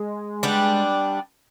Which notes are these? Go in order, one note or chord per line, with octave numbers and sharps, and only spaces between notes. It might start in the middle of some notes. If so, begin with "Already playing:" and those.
Already playing: G#3
G3 B3 D4